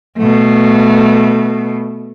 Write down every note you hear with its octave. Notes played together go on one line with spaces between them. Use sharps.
B2 A3